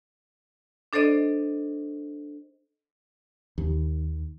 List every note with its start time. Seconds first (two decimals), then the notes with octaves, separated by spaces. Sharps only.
0.93 D4 A4 C5 D5 D#5
3.58 D#2